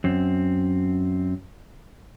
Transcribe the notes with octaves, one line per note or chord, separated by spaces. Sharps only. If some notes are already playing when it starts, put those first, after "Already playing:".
F#2 C4